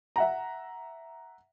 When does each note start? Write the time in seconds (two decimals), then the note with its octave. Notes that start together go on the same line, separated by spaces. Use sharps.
0.16 E5 F#5 A#5